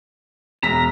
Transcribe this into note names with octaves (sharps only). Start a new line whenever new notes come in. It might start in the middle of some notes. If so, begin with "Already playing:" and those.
E1 A#5 B6